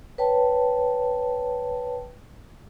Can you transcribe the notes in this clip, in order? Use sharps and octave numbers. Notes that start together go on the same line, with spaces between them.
B4 C#5 G5 A5